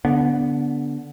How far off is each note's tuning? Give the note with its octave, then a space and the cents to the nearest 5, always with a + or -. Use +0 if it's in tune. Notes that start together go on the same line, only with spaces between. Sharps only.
D3 -15 B3 -5